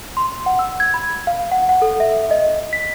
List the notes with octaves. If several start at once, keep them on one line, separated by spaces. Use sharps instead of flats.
C6
F#5
E6
G#6
B5
F5
F#5
F#5
A4
E5
D#5
B6